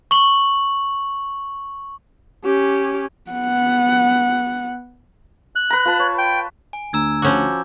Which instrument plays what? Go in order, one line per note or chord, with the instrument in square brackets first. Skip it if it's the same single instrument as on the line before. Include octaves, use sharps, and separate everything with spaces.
[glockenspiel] C#6 F#7
[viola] C#4 G4
[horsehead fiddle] B3 F#5
[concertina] F#6
[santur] B4 A#5
F4 B4 A5
C#5
[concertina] G5
[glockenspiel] G#5
[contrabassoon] D2 [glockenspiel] A#5 E6 G#6
[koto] F3 C#4 F#4 [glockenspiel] D6 G6